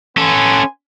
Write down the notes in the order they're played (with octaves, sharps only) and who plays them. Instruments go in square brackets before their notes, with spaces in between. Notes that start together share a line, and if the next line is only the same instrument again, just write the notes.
[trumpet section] B3 G#5 C6 [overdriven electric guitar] C#4 A4